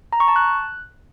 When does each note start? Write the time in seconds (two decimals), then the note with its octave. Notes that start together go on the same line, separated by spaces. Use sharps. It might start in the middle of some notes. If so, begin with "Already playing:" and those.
0.13 A#5
0.20 C#6
0.28 A5
0.36 F#6